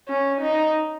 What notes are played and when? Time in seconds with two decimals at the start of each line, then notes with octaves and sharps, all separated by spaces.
0.09 C#4
0.42 D#4